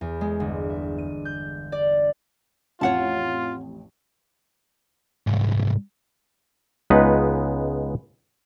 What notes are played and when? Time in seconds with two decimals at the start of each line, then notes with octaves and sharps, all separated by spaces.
0.01 E2
0.21 G#3
0.40 G1
0.70 E5
0.98 D#7
1.25 G6
1.72 D5
2.81 A1 F2 F4 C#5 F#5 A5
5.27 C2 G#2
6.90 C#2 G#3 B3 D#4 B4